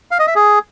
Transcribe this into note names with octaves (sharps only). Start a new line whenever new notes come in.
F5
D#5
E5
G#4